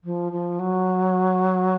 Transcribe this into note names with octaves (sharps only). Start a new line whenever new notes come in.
F3
F3
F#3